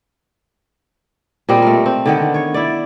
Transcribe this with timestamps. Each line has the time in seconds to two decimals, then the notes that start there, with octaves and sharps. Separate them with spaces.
1.49 A#2 G3 C4 D#5
1.62 A3 A#4
1.86 C4
2.06 D3 D#3 B3
2.34 C#5
2.54 E4 D5